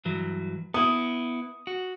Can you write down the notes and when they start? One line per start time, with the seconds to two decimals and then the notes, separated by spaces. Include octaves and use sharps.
0.05 G2 E3 F#3
0.74 B3 E4 D#6
1.67 F#4